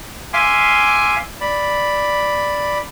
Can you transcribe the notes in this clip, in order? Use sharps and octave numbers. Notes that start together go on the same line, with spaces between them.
E5 F5 G#5 C6 D6
D5 B5